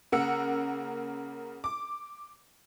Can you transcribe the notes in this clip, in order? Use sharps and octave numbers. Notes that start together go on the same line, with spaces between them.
C#3 A#3 F#5 E6 C#7
D6